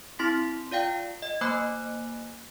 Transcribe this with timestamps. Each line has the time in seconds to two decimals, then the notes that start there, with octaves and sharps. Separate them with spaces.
0.19 C4 E4 C6 B6
0.71 F4 D5 F5 G5
1.22 D#5
1.41 A#3 C5 G#5 B5 D6 F#6